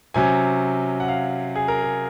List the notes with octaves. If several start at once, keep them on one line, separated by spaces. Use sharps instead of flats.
C3 F#3 C#4 G#5
F#5
F5
G#4
A#4
G#4